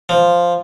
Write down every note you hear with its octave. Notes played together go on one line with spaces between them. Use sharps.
F3